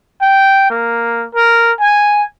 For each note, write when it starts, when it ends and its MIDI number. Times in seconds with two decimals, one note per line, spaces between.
0.22 0.69 79
0.70 1.26 58
1.35 1.72 70
1.80 2.23 80